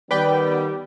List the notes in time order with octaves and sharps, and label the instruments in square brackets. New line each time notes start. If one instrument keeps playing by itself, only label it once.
[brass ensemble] D#3 G3 B3 [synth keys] B4 D5 G5